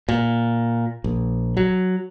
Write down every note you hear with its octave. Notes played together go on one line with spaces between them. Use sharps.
A#2
A#1
F#3